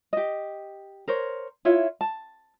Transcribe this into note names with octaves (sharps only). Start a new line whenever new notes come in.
G4 D#5
A#4 C5 C#5
E4 F4 C#5 E5
A5